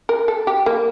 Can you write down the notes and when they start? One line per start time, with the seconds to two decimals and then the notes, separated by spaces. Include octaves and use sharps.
0.09 A#4
0.28 A4
0.47 G4
0.66 A#3